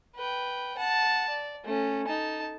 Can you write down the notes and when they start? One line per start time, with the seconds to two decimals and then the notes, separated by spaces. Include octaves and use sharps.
0.15 B4 G5
0.78 F#5 A5
1.29 D5
1.64 A3 C#4
2.08 D#4 A5